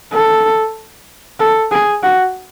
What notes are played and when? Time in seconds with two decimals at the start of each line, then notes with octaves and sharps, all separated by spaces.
0.13 A4
1.40 A4
1.72 G#4
2.03 F#4